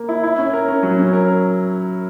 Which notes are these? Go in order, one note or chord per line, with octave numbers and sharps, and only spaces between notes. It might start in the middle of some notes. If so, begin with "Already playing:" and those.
Already playing: A#3
E4
E4
C#4
A#4
C#4
F#3
C#4
A#4